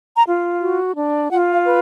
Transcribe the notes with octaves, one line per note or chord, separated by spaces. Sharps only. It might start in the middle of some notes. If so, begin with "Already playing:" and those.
A#5
F4
F#4
D4
F4 F#5
F5
B4